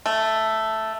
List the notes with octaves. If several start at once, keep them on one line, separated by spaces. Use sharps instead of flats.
A3